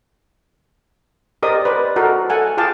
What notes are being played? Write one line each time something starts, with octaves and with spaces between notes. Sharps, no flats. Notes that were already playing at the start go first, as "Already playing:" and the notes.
G4 A#4 C5 D5 D#5 D#6
B4 C5 D5
F#4 A4 A#4 D#5
A4 F#5 G#5
F4 G#4 F5 G5 A5 D6